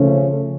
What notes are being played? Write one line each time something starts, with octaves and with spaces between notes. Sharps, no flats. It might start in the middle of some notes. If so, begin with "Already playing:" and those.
Already playing: C#3 F3 A3 C#4